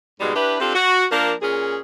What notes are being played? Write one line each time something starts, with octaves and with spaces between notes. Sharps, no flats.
G#2 B2 G3 G#3
D4 E4 G4 B4
C4 D4 F4 G4 A4
F#4
F3 A#3 D4 A#4
A#2 C#4 G#4